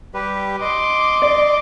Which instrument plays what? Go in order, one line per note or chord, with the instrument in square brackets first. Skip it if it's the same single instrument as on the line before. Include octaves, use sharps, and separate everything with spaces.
[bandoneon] G3 G4 B4
[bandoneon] D#5 [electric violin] C6 D6
[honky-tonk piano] D5